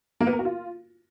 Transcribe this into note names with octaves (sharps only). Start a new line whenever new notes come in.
A#3
B3
A#4
F#4
F4